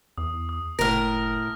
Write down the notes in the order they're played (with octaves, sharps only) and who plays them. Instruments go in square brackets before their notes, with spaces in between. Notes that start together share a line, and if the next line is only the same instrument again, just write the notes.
[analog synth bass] E2 [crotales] D#6
[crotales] D#6
[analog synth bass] F#1 [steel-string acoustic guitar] A2 A#4 [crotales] F6 A#6